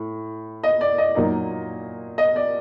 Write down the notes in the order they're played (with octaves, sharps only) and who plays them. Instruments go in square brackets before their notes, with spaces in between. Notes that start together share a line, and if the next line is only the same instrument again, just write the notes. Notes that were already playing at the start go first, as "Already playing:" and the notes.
Already playing: [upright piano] A2
D#5
D5
D#5
A#2 F#3 A#3 D#4
D#5
D5